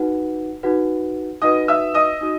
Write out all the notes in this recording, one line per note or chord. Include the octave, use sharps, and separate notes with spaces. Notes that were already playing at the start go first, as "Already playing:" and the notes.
Already playing: D#4 F#4 B4 F#5
D#4 F#4 B4 F#5
D#4 F#4 B4 D#5 F#5 D#6
E5 E6
D#5 D#6
D#4 F#4